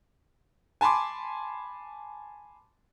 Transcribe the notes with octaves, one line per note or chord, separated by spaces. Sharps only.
G#5 A5 B5 C6 D6